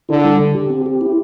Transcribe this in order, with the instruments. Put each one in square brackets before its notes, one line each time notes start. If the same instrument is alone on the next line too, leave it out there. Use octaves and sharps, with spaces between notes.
[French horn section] D3 [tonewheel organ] E4
[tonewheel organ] G3
D3
G4
C4
G4
E4